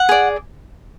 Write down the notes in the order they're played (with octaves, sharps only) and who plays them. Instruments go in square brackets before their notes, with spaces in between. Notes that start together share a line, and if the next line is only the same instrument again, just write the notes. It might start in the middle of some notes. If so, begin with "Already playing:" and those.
Already playing: [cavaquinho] F#5
G#4 D5